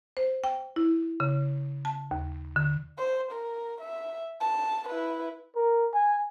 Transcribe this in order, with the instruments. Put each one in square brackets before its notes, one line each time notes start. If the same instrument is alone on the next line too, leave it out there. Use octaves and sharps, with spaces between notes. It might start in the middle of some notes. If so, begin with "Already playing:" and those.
[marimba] C5
G5
E4
C#3
A5
D#2
D3
[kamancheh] C5
A#4
E5
A5
E4 B4
[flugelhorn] A#4
G#5